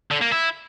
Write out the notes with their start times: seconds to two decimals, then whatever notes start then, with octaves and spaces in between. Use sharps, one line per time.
0.11 D3
0.21 A#3
0.32 E4